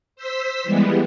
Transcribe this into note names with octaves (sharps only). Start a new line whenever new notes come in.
C5 E6 B6
E3 G3 G#3 B3